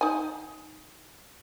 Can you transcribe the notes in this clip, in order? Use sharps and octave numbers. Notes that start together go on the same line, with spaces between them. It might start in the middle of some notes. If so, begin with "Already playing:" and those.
D#4 G#5